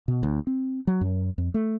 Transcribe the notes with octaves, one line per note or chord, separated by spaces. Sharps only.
B2
D2
C4
F#3
F#2
F2
A3